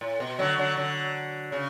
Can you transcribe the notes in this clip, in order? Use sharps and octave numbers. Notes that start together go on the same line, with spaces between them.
A2
B2
D3 F#3
D3 F#3
D3 F#3
C#3